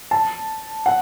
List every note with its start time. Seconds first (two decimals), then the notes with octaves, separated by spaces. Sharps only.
0.11 A5
0.86 F#5